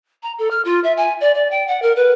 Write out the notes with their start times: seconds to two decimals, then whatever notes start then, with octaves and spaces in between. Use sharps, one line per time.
0.23 A#5
0.38 A4
0.50 F6
0.65 F4
0.84 E5
0.97 G#5
1.20 D5
1.34 D5
1.51 G5
1.67 F#5
1.82 A#4
1.96 B4